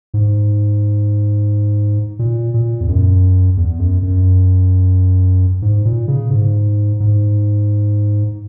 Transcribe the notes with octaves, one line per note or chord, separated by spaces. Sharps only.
G#2
A#2
A#2
E2
F#2
E2
F#2
F#2
G#2
A#2
C#3
G#2
G#2